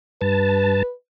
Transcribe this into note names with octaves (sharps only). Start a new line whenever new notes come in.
G2 B4 A5